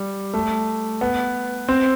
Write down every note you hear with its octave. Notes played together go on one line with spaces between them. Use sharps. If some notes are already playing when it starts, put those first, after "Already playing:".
Already playing: G3
A3
B3
C4